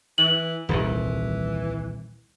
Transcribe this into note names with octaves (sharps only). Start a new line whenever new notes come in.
E3 F#7
D#1 C2 D#3 E3